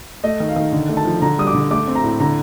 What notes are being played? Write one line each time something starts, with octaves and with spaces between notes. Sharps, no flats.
A3 D#5
D#3
F5
D#3
D3
A3
A5
F3
D3 A#5
G3 D#6
D6
D3
A3 D6
C4
A#5
A2
D3 A#5